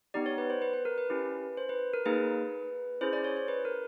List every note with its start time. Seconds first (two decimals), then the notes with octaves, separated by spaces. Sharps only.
0.14 B3 D#4 G4 D5
0.26 C#5
0.38 B4
0.50 C5
0.62 B4
0.73 B4
0.85 A#4
0.98 B4
1.10 C#4 E4 G4
1.57 C5
1.69 B4
1.93 A#4
2.06 A#3 D#4 G#4 B4
3.01 C#4 E4 G#4 C5
3.13 D5
3.24 C#5
3.37 C5
3.48 B4
3.65 A#4